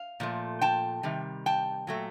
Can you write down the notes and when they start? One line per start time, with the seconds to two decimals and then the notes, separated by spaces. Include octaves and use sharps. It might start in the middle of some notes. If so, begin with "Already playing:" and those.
Already playing: F5
0.20 A#2 F3 A3
0.61 G5 A5
1.03 C3 D#3 G3
1.46 G5 A5
1.87 A#2 F#3 A3